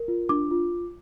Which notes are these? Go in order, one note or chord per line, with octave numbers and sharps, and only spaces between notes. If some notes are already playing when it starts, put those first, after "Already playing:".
Already playing: A#4
F4
D4 D6
F4